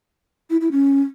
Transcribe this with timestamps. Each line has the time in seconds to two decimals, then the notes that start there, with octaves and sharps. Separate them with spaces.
0.50 E4
0.61 E4
0.72 C#4